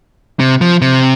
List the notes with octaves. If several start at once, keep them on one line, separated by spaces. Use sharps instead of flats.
C3
F3
C3